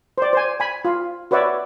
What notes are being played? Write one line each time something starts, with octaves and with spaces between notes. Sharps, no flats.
C5 D5
C5 G#5
G#5 B5
F4
F#4 B4 C#5 D5 E5